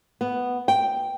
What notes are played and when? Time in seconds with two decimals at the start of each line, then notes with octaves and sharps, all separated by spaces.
0.21 B3
0.68 G5